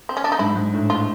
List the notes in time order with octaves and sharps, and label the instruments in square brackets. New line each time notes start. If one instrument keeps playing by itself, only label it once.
[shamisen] C4
C#4
D4
D#4
[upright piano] G#2 [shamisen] E4
[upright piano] G#2
A2
[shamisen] F4